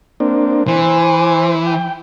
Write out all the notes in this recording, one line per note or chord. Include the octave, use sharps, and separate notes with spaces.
A#3 C4 D4
E3 C5
G5